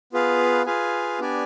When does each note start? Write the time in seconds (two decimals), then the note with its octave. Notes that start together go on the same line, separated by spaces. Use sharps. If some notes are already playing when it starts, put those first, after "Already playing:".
0.13 B3 F4 G#4 B4 F5
0.66 F4 G#4 B4 F5 G#5
1.19 B3 D4 G4 D5 G#5